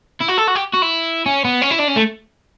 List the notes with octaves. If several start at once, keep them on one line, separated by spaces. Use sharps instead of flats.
E4
F#4
A4
F#4
G4
F#4
E4
C#4
B3
C#4
E4
D4
C#4
A3